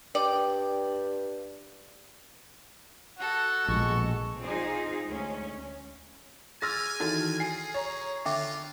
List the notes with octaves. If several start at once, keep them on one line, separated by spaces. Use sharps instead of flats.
G2 D5 G5 D#6 G6
F#4 A4 F#5
A#1 B2 G#3 C#6
C4 D#4 F4 G#4 C5
D2 G#3 C#4
G#4 G#5 C6 E6 F6 A6 A#6
D#3 E3 F#4 A4 A5 A6
G#4 G#5 C7
C#5 A#5
D3 F4 E5 G5 D6